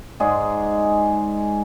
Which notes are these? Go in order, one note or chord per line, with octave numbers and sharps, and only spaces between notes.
G#2 G#3 G#4 D5